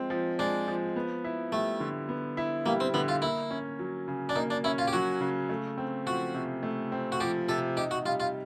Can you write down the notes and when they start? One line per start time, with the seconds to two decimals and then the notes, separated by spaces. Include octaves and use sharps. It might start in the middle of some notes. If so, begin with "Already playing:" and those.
Already playing: F3 G#3 C4
0.10 F3
0.39 G#3 D4
0.67 F3
0.96 B3
1.24 E4
1.52 G3 A3
1.80 D3
2.09 B3
2.37 E4
2.66 G3 A#3
2.80 C4
2.94 D3 B3
3.08 F4
3.22 A#3 E4
3.51 C#4
3.79 F#3
4.08 C#3
4.29 D4
4.36 A#3 D#4
4.50 D4
4.64 C#4 E4
4.78 F4
4.88 G4
4.93 F#3 F#4
5.21 C#3
5.49 A3
5.78 C4
6.06 F3 F#4
6.34 C3
6.63 A3
6.92 C4
7.12 F#4
7.20 F3 G4
7.49 C3 A4
7.76 D#4 G4
7.91 F#4
8.05 G3 F4
8.20 F4